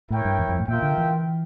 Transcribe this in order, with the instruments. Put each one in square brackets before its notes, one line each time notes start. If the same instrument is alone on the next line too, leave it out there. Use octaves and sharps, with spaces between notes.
[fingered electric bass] A2 [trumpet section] E4 A#4 C#5 G5
[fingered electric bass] G2
E2
F2
A2
[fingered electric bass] A#2 [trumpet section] F4 A#4 E5 G5
[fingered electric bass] D3
E3